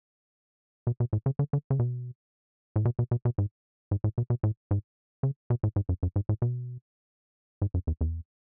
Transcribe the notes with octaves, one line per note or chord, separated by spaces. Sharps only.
B2
B2
A2
C#3
D3
D3
C#3
B2
A2
B2
B2
B2
B2
G#2
G#2
A2
B2
B2
A2
G#2
C#3
B2
A2
G#2
F#2
F#2
G#2
A2
B2
G#2
F#2
E2
E2